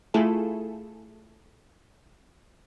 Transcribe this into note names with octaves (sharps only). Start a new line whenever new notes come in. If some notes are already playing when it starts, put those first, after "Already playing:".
A3 E4 F4 G#4 A4